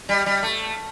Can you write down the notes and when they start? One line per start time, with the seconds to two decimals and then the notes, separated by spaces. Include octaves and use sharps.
0.09 G3
0.26 G3
0.43 A3